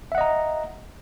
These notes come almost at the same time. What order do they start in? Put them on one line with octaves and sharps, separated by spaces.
E5 F#5 D#5 A#5